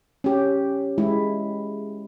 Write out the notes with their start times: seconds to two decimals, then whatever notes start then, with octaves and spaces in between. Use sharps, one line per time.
0.24 C#4 G4
0.98 G#3 E4